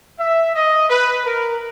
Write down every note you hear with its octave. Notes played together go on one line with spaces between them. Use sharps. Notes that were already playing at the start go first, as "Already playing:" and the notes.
E5
D#5
B4
A#4